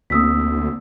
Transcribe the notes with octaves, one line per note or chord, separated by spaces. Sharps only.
D2 A#3 C4 C#4 D#6 E6 B6